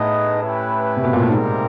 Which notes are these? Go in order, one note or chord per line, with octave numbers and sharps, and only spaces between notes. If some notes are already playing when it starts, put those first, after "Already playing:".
Already playing: A2 B3 D#4 G#4 B4 D#5
C#4 E4 G4 B4
C3
B2
A#2
A2
G#2 G3 C4 D#4 G4 A#4